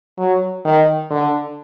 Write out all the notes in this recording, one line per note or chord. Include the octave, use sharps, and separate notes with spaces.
F#3
D#3
D3